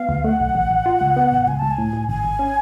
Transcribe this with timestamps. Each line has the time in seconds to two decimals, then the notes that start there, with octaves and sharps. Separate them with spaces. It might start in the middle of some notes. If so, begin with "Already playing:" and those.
Already playing: B3 F5
0.09 D2
0.24 A3 F#5
0.40 B1
0.55 A1
0.70 A1
0.86 F4
1.01 C#2
1.16 B3
1.32 A1
1.47 C#2 G#5
1.59 C#2 A5
1.71 G#5
1.78 A2
1.93 A2
2.08 G#1 G#5
2.24 G#1
2.39 C#4